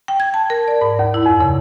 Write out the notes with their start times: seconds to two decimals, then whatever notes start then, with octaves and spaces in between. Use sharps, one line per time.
0.08 G5
0.20 G#6
0.34 A5
0.50 A#4
0.68 D5
0.81 G#2
0.99 D#2
1.14 E4
1.26 F2
1.41 C#3